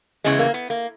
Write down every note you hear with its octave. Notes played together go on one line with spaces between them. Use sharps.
E2 C#3 E3 G#3
A#3
B3
A#3